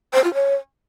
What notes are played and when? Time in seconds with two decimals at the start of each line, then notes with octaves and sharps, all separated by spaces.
0.14 C5
0.24 F4
0.34 C#5